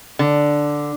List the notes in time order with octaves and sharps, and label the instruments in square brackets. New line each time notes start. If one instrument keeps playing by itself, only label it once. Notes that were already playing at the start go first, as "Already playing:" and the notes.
[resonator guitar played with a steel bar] D3